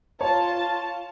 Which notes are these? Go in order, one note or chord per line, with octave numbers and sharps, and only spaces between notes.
F4 C#5 A5